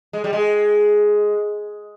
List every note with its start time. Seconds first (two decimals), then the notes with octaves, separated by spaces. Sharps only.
0.13 G#3
0.24 G3
0.33 G#3